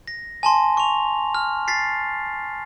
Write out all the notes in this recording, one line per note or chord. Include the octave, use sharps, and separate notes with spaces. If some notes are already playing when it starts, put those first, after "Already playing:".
A#6
G#5 A5 C6
C#6 F7
F6
A6 B6 C7